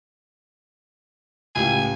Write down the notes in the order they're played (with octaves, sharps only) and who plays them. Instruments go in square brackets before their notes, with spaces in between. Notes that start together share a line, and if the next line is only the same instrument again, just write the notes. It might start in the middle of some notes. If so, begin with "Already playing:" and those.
[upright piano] C#2 A2 G4 [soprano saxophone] G#5